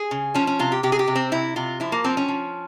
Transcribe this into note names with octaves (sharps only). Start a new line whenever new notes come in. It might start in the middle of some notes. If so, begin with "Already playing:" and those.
Already playing: G#4
C#3
F3 C#4
C#4
C3 F4
G4
C3 G4
G#4
G4
C3
C4
C3 E4
C3 F4
F3 E4
A#3
F3 C4
C#4
F3